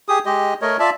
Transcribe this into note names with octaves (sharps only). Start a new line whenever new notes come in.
G4 G#4 D#6
G#3 G4 D#5
A3 A#4 C#5 D#5
F4 D5 E5 A5